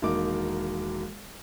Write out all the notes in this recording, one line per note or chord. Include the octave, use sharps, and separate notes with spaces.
E1 D#3 A#3 D6